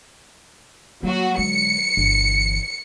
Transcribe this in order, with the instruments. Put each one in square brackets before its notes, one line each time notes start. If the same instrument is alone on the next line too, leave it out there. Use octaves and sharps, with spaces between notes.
[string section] F#3 F#4 [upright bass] A#3
[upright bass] D3 G#3 [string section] C#7
[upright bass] G1 E3